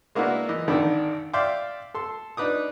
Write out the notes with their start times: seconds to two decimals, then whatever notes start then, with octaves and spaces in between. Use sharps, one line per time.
0.15 G#3 A#3 B3 D4 E4 F#4
0.49 E3 D#5
0.68 G#1 D3 D#3 D4 A4 B5
1.34 D5 E5 F5 G5 C6 D6
1.94 A4 C6
2.37 D4 D#4 B4 D6 D#6